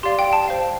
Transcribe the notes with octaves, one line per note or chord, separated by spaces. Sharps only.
G4 D5 F5 C6
G5
A5
C5 F5